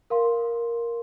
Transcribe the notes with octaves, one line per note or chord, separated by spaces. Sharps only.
A#4 F5 C6